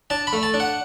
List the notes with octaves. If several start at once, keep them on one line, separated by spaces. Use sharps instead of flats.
D4 A5
B5
A3
A5
D4
F#5